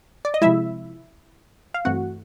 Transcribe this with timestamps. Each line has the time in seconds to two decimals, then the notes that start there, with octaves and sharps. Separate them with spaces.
0.25 D5
0.34 D#5
0.41 C3 F3 G#3 E4 E5
1.74 F5
1.85 G2 E3 A3 C4 F#4 F#5